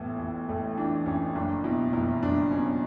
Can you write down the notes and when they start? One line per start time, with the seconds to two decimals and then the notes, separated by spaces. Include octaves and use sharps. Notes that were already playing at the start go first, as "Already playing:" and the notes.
Already playing: A1 A2 B3
0.19 A1
0.49 A1 A3
0.77 E3 D4
1.06 A1 C#4
1.35 F#1 D4
1.64 B2 E4
1.93 F#1 E4
2.22 F#1 D4
2.51 B2 C#4